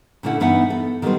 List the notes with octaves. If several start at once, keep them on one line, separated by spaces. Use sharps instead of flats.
A#2 D3 A3 C#4 E4 F#5
G2 E3 B3 D#4 E5 F#5
A4
D#3 F#3 G3 A3 B3 C4